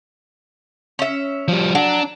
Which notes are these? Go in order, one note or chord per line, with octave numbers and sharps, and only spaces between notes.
C#4 E5
F3 G3
F#3 D4